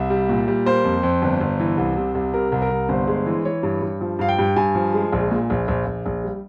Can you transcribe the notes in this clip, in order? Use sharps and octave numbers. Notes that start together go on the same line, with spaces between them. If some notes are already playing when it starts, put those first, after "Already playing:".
Already playing: C2 E5
G3
A#2
G3
A#3 C5
F2
F2
G1
G1
E3
C2
C3
C2
C3 A#4
C2
A#4
C2
G1 C5
G#3
E3
E3 C#5
G2
G2
F3
G2 F5
G5
G2
G2 G#5
F3
G#3
A#1
A#2
A#1
A#1
A#1
A#1
G3